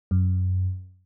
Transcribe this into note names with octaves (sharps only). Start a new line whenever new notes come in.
F#2